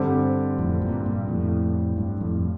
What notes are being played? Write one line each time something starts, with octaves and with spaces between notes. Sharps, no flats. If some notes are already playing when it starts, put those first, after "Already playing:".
Already playing: G2 D3 G3 C4 G4 C5
F2 A2
G2 A#2
G2 A#2
F2 A2
G2
F2 A2